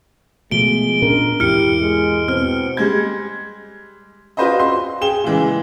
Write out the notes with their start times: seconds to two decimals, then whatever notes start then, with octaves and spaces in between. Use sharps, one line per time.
0.51 B2 F3 G#3 A3 D7 G7
1.02 A#2 C#4 D4 A#4
1.40 E2 G#2 E4 G4 F6 C#7
1.81 G#3
2.28 B2 C4 F6
2.77 G3 G#3 G#6
4.37 F4 F#4 B4 C5 D5 D#5
4.60 C6
5.01 G#4 G5 E7 G7
5.24 A#2 C#3 E3 G#3